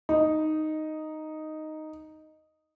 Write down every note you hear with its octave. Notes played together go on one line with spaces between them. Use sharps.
D#4